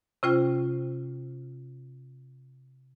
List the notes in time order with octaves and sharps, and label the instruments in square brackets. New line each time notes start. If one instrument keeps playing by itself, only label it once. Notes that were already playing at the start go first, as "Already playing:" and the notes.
[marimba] C3 C#4 F4 C5 G5 F6